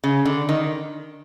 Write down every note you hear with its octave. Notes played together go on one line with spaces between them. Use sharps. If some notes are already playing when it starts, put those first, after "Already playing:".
C#3
D3
D#3